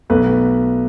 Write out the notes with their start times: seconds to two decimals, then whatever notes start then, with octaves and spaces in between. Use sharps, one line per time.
0.10 B1 B2 A3 B4